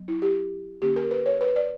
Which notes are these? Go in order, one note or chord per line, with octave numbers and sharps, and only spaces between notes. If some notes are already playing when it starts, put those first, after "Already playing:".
Already playing: F#3 B3
E4
G4
D3 A#3 C#4 G4
A#4
B4
C#5
B4
D5